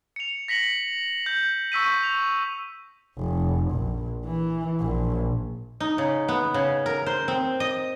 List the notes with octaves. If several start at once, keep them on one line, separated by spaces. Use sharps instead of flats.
C#7 F7
A#6 B6 C#7 F#7
G6
C#6 E6 B6 D#7
F7
F1
A#1
E3
A#1
D#4
C#3
B3
C#3
A#4
C5
C4
D#5